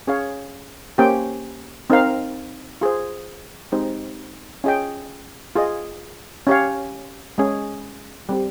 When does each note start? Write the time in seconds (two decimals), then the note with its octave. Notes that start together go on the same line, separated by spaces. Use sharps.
0.07 C#4 G#4 C#5 F5
0.98 A#3 C#4 G4 C5 G5
1.90 C4 D#4 A#4 F5
2.81 F4 G#4 C5
3.72 G#3 C4 D#4 G4 C5
4.64 C#4 F4 G#4 D#5 G5
5.55 F4 G#4 D#5
6.47 C#4 G4 C#5 F5
7.38 G#3 C#4 G#4
8.29 G3 C4 G4